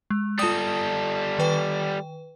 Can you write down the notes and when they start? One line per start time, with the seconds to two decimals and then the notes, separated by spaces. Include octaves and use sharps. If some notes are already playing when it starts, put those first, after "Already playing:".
0.10 G#3
0.39 G3 F4 A4 D#6
1.39 D#3 B4 G5